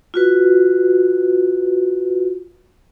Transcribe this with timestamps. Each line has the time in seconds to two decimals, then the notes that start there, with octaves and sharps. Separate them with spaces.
0.14 F4 F#4 B4